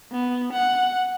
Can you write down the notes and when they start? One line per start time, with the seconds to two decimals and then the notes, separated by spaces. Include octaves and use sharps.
0.12 B3
0.53 F#5